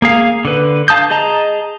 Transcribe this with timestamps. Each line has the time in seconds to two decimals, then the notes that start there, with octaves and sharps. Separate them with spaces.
0.02 A#3 G#4 F5
0.45 D3 B4
0.88 F5 A5 D#6 G6
1.11 G#4 D#5 A5 A#5